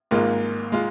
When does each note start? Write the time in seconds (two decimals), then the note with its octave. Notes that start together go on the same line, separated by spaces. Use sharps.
0.11 G#1 G#2 G#3 A#3 F4
0.72 G#3 F4